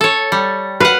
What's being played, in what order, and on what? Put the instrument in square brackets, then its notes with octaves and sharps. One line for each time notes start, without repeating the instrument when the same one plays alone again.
[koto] A4 C#5
G3
[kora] B4 [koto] F5 F#5